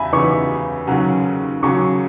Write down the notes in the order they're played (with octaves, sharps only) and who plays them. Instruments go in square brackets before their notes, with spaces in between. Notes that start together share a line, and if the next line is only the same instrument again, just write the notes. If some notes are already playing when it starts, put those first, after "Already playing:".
Already playing: [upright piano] E2 C#3 [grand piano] E5 G#5 B5
[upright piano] E2 C#3 E3 B3 D#4 [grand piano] C#6
[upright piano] D#2 C#3 F#3 C#4 F#4
[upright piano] D#2 C#3 F#3 C#4 F#4 [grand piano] C#6